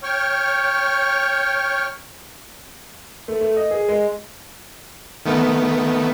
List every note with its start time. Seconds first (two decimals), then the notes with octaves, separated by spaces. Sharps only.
0.03 C#5 G5 C#6 F6
3.28 A3
3.41 A3
3.57 D#5
3.71 G#4
3.89 G#3
5.26 D#3 A3 B3